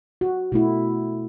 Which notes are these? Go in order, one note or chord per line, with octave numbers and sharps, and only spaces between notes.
F#4
B2 A3 E4 F#4